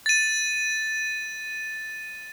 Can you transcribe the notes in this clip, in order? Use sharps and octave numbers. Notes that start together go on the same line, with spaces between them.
A6 D#7